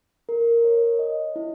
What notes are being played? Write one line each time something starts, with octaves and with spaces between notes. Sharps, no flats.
A#4
C#5
D#5
E4